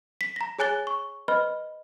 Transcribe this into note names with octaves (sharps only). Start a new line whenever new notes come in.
B6
A#5 A#6
G#4 C#5 G#5 F#6 A6 G7
C#6
B4 C5 D#5 B5 F6